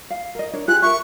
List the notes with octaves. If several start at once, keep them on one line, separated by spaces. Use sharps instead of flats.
F5
A#4 D#5
D4 A#4 C#5
F4 G4 G#4 F#6
A#4 E5 C#6